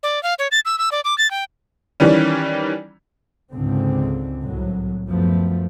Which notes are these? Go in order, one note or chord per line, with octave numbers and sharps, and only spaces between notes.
D5
F5
C#5
A6
E6
E6
D5
D6
A6
G5
D#3 E3 G3 C#4
C#2 G#2 D3 C4
C2 A2 F#3
F#2 F3 A3 B3